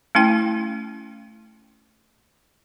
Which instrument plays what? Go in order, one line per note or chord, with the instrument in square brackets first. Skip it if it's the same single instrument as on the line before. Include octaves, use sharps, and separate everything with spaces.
[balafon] A3 C#4 E4 G5